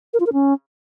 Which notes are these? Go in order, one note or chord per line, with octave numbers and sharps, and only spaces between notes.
A#4
F4
A#4
C#4